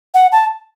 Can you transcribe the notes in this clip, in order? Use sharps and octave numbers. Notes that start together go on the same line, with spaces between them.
F#5
A5